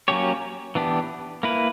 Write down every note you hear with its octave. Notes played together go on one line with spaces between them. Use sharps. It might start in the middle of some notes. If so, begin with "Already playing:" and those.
F#3 A#3 C#4 G4 C#5
E3 B3 D4 G4
A#3 E4 B4